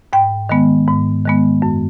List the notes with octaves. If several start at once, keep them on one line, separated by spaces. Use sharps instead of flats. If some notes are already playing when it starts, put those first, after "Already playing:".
G#2 G5
D#3 G#3 B3
G#2
D#3 G#3 B3
F#2